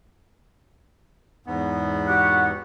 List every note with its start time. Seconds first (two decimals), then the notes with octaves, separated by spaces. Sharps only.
1.46 E2 G#2 B3
2.07 F#4 G4 F#5